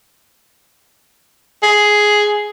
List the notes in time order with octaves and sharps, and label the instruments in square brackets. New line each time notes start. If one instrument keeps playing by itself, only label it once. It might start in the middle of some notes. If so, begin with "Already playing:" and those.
[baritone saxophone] G#4